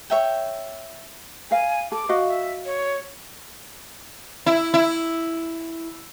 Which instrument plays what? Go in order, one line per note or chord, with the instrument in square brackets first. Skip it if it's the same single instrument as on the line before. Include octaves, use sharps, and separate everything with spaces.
[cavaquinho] C#5 E5 G5
[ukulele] A#4 F5 [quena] G#5
[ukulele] A4 [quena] D6
[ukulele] F#4 D#5 F5
[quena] E5
C#5
[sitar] E4
E4